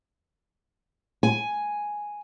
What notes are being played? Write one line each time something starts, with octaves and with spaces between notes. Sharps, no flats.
G#5